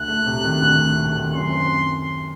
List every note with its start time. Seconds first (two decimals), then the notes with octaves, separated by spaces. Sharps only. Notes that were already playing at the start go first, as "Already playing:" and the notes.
Already playing: D2 F#6
0.08 A3
0.26 C3
0.45 D#3
0.62 D2
0.80 A3
0.98 C3
1.17 D#3
1.35 F#2 C6
1.52 C4